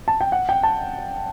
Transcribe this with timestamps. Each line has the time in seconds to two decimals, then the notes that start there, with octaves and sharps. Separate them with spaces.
0.08 A5
0.21 G5
0.32 F#5
0.49 G5
0.63 A5